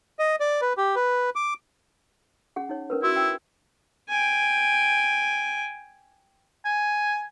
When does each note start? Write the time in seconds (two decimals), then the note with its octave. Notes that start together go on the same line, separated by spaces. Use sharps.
0.19 D#5
0.40 D5
0.62 B4
0.77 G4
0.96 B4
1.36 D6
2.56 C#4 G#4 F#5
2.69 D#4 C#5
2.90 C#4 A#4 B4
3.03 E4 F#4 E6
3.16 G5
4.09 G5 G#5
6.65 G#5